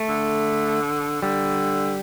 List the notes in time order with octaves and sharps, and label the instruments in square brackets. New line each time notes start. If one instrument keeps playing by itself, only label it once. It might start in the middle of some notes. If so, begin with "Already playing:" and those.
Already playing: [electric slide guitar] A3
[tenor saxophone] D3
[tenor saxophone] D3 [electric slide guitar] G3